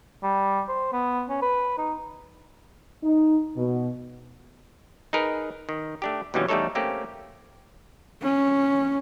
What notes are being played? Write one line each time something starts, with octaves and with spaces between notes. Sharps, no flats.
G3
C5
B3
C#4
B4
D#4
D#4
B2
D#4 G#4 A#4 B4
D#3
A3 D4 G4
D#2 B2 E3 F#3 G3 C#4
E2 G3 A3 D#4 A4 C#5
A3 A#3 C4 C#4 G4
C#4